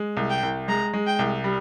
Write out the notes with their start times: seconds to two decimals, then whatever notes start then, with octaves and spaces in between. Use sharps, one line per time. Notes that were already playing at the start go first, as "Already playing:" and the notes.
Already playing: G#3
0.17 C2
0.30 G5
0.43 C2
0.68 G#3 A#5
0.94 G#3
1.07 G5
1.19 C2
1.44 G3